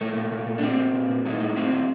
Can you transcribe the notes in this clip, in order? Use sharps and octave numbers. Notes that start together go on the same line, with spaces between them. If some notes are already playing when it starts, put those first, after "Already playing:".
A#2 A3
A#2
A#2
A#2
D4
A#2 C4
A#2
A#2
A#2
A2 D#4
A2
A2 C4
A2